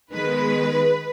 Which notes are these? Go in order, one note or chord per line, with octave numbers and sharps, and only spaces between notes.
D#3 G#3 B3 B4